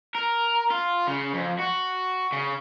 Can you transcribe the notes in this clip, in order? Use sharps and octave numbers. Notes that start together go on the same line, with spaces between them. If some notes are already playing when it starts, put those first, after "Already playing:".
A#4
F4
C#3
F2
F#4
C#3